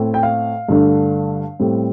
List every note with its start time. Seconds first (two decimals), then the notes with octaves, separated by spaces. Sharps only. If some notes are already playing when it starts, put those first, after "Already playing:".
Already playing: A2 A3 C4
0.14 G5
0.23 F5
0.69 G2 D3 A3 D4
1.59 A2 G3 C4